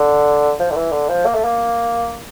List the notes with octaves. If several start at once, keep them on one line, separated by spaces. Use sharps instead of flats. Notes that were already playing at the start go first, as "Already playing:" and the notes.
Already playing: D3
F3
D3
E3
D3
F3
A#3
A3
A#3